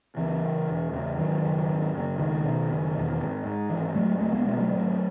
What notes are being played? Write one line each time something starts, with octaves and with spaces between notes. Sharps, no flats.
C#2 E3
C#3
E1
E2 C#3
G#1 D#3 F#3
F#2 C#3
G#1
F#2 C#3
C#2 D#3
B2
F#1
E2 B2
G#1
G#2
G#1 E3
G#2 F#3 A3
C#2 F#3 A3
G#3 B3
B2 G#3 B3
F#3 A3
G#1 F#3 A3